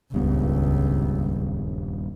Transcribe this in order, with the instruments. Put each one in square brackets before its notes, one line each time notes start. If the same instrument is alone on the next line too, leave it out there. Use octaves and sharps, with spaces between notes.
[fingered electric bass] D#1 G2 B3 [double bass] C#2